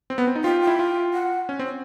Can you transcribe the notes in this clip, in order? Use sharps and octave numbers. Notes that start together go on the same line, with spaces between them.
C4
B3
C4
D#4
F4 G5
G5
E4
F4
F#5
C#4
C4